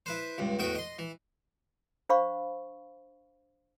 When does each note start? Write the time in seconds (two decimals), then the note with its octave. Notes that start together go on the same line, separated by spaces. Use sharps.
0.06 E4 B4 C5
0.38 C#2 G2
0.59 E2 A2 F#4 G5 D#6
0.75 D#5 C6
0.99 E3
2.09 D4 C5 F5 B5 C#6